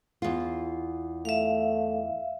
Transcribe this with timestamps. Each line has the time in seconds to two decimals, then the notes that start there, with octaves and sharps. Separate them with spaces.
0.22 E2 F4
1.25 A3 E5 F5